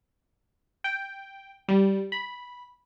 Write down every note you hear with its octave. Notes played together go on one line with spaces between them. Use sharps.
G5
G3
B5